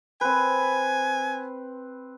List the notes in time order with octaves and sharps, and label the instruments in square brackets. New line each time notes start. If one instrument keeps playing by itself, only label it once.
[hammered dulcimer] C4 B4 [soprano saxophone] G#5